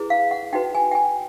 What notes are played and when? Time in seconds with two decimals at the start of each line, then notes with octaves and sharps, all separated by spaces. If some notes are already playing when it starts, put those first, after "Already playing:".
Already playing: E4 G#4 B4
0.10 F5
0.31 F#5
0.53 D#4 F#4 B4 G5
0.75 G#5
0.91 G5
0.95 G#5